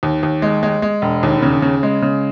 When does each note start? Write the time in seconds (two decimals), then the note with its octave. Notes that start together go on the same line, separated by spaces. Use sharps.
0.03 D#2
0.23 D#2
0.42 G#3
0.63 G#3
0.82 G#3
1.02 E1
1.23 D#2
1.42 C#3
1.62 C#3
1.83 G#3
2.02 C#3